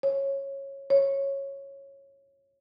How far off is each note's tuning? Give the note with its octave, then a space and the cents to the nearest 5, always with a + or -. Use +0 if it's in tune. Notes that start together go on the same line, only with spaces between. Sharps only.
C#5 -15
C#5 -10